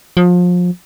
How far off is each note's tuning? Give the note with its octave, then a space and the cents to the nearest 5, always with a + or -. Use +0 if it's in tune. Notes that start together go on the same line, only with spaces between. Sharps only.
F3 +30